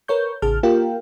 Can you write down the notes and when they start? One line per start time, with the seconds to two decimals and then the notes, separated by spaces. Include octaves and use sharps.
0.08 A#4 B4 C#5 C#6 G6
0.42 A1 C#3 G#4 A5 F6
0.63 A#3 F4 G4 A#4 F5 G5